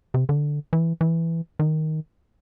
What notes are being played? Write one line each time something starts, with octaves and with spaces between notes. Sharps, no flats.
C3
D3
E3
E3
D#3